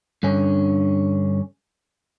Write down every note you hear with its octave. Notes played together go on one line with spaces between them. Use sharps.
G2 D3 C#4